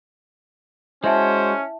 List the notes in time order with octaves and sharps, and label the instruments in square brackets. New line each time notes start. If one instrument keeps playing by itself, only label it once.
[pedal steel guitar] G#3 F#4 [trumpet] C#4 [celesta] E4 E5 A5 [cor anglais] C5